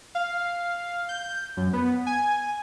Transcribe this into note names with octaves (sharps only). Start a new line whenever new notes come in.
F5
G6
F#2
B3
G#5